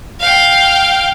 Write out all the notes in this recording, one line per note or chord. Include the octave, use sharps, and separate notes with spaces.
F5 G5